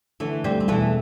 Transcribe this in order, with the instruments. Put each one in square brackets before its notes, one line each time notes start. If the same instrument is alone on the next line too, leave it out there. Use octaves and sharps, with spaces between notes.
[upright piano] D3 [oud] E3 A3
[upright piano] D2 [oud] G3 C4
[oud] C4
[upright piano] E1 [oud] E3 A3